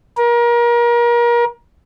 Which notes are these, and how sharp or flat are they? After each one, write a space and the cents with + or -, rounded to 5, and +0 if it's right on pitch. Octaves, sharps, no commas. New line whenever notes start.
A#4 +30